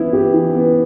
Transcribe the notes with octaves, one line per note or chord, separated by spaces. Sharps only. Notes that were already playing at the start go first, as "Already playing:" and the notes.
Already playing: E3 B3 E4
G4
E3
B3